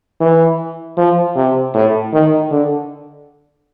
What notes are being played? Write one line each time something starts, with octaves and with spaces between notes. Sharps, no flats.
E3
F3
C3
A2
D#3
D3